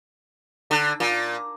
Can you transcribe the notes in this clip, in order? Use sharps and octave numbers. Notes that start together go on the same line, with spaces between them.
D3
A#2